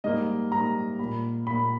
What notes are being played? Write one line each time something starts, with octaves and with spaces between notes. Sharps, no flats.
G#2 G3 A#3 D#5
G#2 G3 A#3 A#5
A#2 A#3 B5
A#2 A#3 B5